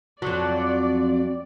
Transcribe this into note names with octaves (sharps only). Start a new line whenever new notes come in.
F2 F#3 D5